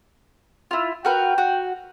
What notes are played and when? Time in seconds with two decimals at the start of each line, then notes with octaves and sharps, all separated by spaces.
0.71 E4 F4
1.05 F#4 A#4 B4 G5
1.38 F#4